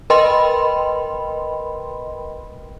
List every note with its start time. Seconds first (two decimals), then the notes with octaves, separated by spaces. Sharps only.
0.10 A#4 B4 D#5 G5 B5 C6